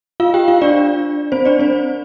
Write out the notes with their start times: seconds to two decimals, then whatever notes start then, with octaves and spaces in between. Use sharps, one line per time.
0.20 F4 F5
0.34 G4 G5
0.48 F4 F5
0.61 D4 D5
1.32 C4 C5
1.45 D4 D5
1.59 C4 C5